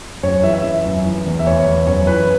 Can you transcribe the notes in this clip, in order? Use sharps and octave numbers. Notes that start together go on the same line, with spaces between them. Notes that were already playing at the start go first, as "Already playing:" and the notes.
F#2 C#5
E3 E5
E5
E3
F#2
E3
E2
E5
E2 C#5
E2
F#2 C#5
E3 B4